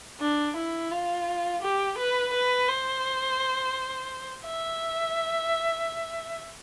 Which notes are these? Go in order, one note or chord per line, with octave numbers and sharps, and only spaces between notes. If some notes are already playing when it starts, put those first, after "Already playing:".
D4
E4
F4
G4
B4
B4
C5
E5